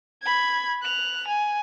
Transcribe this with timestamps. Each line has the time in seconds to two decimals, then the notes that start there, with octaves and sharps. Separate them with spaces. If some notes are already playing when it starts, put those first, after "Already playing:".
0.22 B5 G#6
0.82 F#6 F7
1.27 G#5